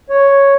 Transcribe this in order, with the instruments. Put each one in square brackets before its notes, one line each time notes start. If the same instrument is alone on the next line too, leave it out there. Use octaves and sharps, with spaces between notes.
[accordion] C#5